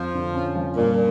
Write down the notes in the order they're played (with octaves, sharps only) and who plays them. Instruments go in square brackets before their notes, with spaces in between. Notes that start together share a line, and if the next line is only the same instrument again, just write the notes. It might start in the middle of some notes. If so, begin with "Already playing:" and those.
Already playing: [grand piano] F2 [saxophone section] F3
[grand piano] D3
C#4
F3
[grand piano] G2 [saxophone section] A#2